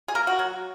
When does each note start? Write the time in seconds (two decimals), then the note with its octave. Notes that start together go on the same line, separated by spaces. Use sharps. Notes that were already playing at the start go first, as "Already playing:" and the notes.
0.08 G#4
0.15 A#3 A#4
0.27 F#4
0.39 F#3